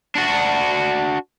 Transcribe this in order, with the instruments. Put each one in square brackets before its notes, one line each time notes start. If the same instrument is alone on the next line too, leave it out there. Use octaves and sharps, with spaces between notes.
[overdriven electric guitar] D4 F#4